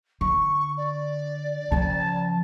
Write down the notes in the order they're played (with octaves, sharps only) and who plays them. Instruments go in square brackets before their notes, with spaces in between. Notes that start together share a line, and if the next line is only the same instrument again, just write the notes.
[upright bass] D3 [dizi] C#6
[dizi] D5
[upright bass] C#3 F3 [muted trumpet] A5